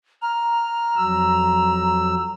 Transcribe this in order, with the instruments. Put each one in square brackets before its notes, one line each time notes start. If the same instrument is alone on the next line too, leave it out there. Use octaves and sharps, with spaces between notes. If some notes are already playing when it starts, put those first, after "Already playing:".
[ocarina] A#5 [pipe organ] F6
[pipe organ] F2 F#3 E6